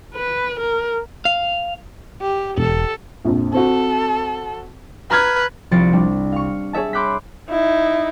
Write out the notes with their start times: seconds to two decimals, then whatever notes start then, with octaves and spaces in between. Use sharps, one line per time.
0.15 B4
0.60 A#4
1.25 F5
2.21 G4
2.58 E1 A4
3.25 A#1 F2
3.54 C4 F#4 A4
5.11 B4 A#5 F6 G#6
5.71 C2 F3 A6 C#7 D7
5.93 G3 D4
6.32 F5 C#6
6.73 G#4 C#5 E5 A5
6.93 B5 C6 D6 F#6 G6 B6
7.49 D#4 E4